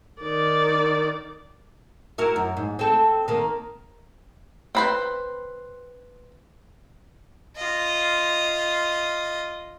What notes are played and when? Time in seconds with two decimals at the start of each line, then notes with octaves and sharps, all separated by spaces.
0.22 D#3 D5
2.18 E4 F#4 A#4
2.36 F#2
2.57 G#2
2.79 C4 A4
3.28 D#3 A#3
4.75 C4 B4 C5
7.56 F4 D#5